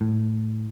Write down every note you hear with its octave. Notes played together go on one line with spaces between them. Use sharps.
A2